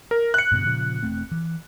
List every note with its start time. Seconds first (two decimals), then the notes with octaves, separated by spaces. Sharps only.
0.11 A#4
0.34 F#6 C#7
0.52 G2 B2 D3
0.65 A#2 C#3 F3
1.03 E1 A3 C4
1.32 E3